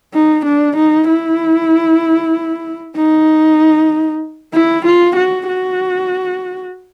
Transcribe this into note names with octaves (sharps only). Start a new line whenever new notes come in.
D#4
D4
D#4
E4
D#4
E4
F4
F#4
F#4